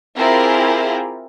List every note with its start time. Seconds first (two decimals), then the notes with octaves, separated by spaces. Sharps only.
0.17 C4 E4 F4 G4 G#4 A#4